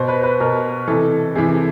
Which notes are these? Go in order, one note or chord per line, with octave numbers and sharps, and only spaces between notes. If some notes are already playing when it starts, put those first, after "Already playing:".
Already playing: B2 C5
B4
B4
B2 A#4
C3 E3 A4
C3 E3 G#4